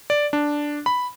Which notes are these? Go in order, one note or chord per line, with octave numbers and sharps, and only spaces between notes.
D5
D4
B5